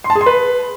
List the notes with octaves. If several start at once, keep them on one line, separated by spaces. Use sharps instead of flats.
C6
A5
G#4
C6
B4